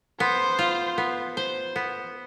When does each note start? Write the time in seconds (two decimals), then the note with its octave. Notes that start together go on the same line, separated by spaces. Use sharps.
0.20 B3 C5
0.59 F4
0.98 B3
1.37 C5
1.76 B3